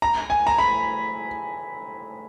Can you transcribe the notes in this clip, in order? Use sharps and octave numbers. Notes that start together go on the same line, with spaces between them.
A#5
G#5
A#5
B5